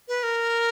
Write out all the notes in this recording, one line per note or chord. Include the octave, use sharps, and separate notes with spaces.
B4
A#4